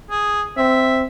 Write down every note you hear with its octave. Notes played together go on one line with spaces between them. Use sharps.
G#4
C4 E5